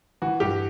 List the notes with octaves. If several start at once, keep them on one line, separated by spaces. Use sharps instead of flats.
E3 F#4
G2 G4